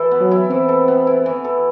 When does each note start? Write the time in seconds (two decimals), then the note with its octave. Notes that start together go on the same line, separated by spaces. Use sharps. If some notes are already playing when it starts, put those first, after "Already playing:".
Already playing: E3 E4 A4
0.11 B3
0.21 F#3
0.31 E4
0.50 E3 C4
0.69 A4
0.88 B3
1.07 E4
1.26 E3
1.44 A4